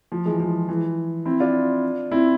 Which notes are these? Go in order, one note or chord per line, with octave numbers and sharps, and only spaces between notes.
F3
E3 G#3
F3
E3
C4 E4
D4 F4
C4 E4